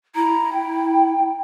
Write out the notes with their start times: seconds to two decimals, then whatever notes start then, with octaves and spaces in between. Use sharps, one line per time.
0.16 E4 A#5
0.53 G5